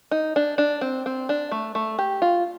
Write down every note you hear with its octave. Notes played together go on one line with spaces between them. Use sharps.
D#4
D4
D4
C4
C4
D4
A3
A3
G4
F4